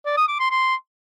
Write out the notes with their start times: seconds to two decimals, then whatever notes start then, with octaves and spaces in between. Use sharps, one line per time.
0.06 D5
0.17 D#6
0.28 D6
0.40 C6
0.51 C6